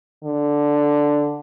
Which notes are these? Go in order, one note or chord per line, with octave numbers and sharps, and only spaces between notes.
D3